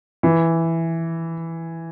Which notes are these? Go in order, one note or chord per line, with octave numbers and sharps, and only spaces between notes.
E3